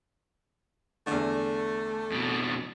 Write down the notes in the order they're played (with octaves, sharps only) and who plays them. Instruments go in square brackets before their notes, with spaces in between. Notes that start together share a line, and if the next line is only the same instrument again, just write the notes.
[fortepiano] E2 D3 [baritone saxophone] A3
[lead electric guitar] F2 B2